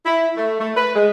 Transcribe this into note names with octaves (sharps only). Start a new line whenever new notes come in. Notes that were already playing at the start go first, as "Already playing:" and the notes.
E4
A3
A3
B4
G#3